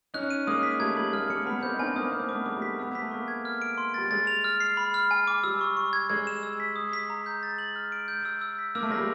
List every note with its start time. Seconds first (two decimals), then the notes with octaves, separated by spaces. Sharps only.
0.14 C#4 D#4 F#6
0.31 D#7
0.47 G#3 A#3 D#6
0.63 B6
0.80 G3 A3 G#6
0.96 G3 A3 F#7
1.13 G#3 A#3 F6
1.30 G#3 A#3 C#7
1.46 A3 B3 B5
1.63 A#3 C4 G6
1.73 D#4
1.79 C4 D4 G#5
1.96 A#3 C4 D#6
2.12 A#3 C4 G6
2.29 A#3 D6
2.34 A3 B3
2.46 G#3 D6
2.56 G3 A3
2.62 B6
2.79 B3 E6
2.90 A#3
2.95 B6
3.01 A3
3.11 G#3 A#3 C#6
3.28 G#6
3.45 F6
3.62 D7
3.78 C6
3.94 G3 A6
4.11 G#3 A6
4.27 F7
4.44 F6
4.60 C7
4.77 B5
4.94 F6
5.11 G#5
5.27 D6
5.44 G3 E6
5.61 C#6
5.77 C#6
5.93 G#6
6.10 G#3 G#6
6.27 E7
6.43 E6
6.60 B6
6.76 D#6
6.93 B6
7.10 A#5
7.26 G6
7.43 A6
7.59 F#7
7.76 F6
7.92 D7
8.08 G6
8.25 E6
8.42 E6
8.59 B6
8.75 A#3 E6
8.83 A3
8.90 G#3 A#6
8.97 G3 A3